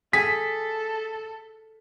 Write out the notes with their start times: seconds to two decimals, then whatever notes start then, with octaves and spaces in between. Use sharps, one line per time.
0.13 G#4 A4 B6